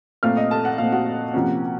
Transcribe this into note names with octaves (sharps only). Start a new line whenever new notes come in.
A#2 A3 C4 F5 F6
D#5 D#6
A4 A5
F#5
A#2 A3 C4 F5
F#4 F#5
C3 F3 A#3 C#4